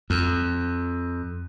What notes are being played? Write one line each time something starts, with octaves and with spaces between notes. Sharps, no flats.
F2